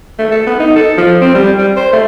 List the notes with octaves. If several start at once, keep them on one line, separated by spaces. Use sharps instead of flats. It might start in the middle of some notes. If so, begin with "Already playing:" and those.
A3
A4
B3
D#4
A4
F3
C4
G3
G3
C5
A3